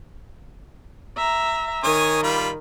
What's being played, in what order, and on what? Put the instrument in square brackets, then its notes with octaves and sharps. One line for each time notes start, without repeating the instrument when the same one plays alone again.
[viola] E5 A#5
[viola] D#3 [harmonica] C#5 G#5 D#6
[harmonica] G3 F4 B5